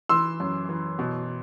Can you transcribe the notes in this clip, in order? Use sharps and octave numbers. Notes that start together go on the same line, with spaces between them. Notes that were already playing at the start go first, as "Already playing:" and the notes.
E3 C6 E6
F#2
E3
B2